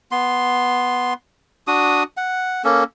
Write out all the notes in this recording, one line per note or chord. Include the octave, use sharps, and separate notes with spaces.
B3 C6
D4 F#4 D#6
F#5
A#3 C#4 A4